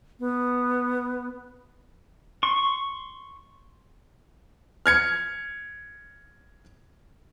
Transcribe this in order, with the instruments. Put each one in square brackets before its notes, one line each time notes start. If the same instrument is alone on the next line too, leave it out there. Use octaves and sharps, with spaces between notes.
[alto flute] B3
[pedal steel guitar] C6 C#6
[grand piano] F6 G#6 C#7